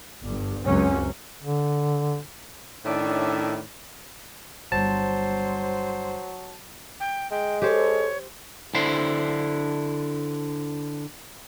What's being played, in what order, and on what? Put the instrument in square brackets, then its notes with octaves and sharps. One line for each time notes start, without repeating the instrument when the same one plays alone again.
[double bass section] G1 G2
C#2 F#2 F#3 C4 C#4
[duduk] D3
[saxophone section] A2 D#3 C#4 D4 D5 E5
[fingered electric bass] G1 G2 [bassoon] F#3 [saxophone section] C5 [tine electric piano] A5
[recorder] G5
[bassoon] G#3 [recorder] G5
[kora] G4 C5 [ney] A4 [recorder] C#5
[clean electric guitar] D3 D4 E4 C5